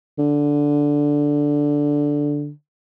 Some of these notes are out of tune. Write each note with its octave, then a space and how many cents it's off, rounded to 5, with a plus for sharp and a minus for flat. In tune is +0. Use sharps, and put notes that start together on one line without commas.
D3 -5